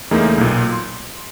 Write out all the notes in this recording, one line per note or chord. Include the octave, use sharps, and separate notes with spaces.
E2 C#3 A3 A#3 D#4 E4
B1 A#2
C6